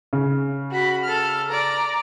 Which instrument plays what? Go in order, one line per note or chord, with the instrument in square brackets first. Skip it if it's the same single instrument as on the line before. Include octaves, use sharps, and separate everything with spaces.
[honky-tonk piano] C#3
[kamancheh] F#4 B5
A4 F6
D5 A#5